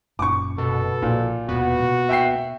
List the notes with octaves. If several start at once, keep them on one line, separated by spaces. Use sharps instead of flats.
F#1 A#2 C#4 C#6 D6
B2 A4
A#1 A#2
D#1 B2 B3 F#4
B2 A#3
E5 G5 C7